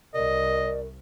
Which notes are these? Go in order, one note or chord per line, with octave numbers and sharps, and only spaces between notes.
C2 A#4 D5 D#5